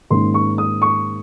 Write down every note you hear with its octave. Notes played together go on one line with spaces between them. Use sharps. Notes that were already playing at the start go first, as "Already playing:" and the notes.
G#2 D#3 A#3 C#4 C6
C#6
D#6
C#6